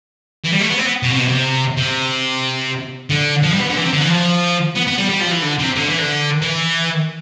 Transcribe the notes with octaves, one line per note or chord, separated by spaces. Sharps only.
E3
G3
A3
B3
C4
B3
B2
C3
B2
C3
C3
D3
F3
G3
B3
D3
E3
C3
D3
E3
F3
B3
B3
G3
G3
F3
E3
D3
C3
D3
E3
D3
E3